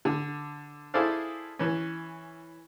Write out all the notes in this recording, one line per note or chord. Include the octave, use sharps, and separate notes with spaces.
D3
E4 G#4 A4 C5 D5 F5
E3 C#4